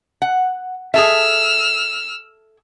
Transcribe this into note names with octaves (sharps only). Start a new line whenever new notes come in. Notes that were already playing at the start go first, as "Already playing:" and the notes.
F#5
G#4 A4 E5 E6 F6